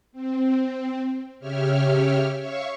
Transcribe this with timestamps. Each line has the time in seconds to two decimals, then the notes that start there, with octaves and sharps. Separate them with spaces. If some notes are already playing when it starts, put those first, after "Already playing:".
0.12 C4
1.40 C#3 G4 C#5 E5 F6
2.40 C#5 E5 F5 C#6